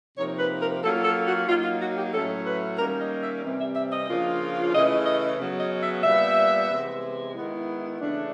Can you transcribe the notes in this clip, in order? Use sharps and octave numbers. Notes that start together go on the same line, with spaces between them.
C3 F3 A#3 D#4 C#5
B4
A#4
F#3 A#3 C#4 F4 A4
A4
F#4
F#3 A#3 D#4 F4
F4
F#4
G4
A2 F#3 A3 C#4 A4
B4
D#3 G3 A#3 C#4 A#4
D#5
E5
C3 E3 G3 C4
E5
E5
D#5
C#3 F3 A#3 D4 F4
C#3 E3 A3 C#4 E4 D#5
D#5
C#3 F#3 B3
D#5
E5
A#2 G3 B3 E5
C3 E3 G#3 B3
D#3 G#3 B3 E4
C#3 E3 A3 D4